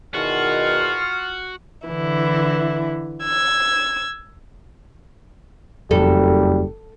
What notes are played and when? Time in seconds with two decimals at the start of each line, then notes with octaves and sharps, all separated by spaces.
0.14 E2 B2 D#3 F4 F#4 F6
1.87 D3 E3 E4
3.23 E6 G#6
5.91 F#1 F2 G3 A4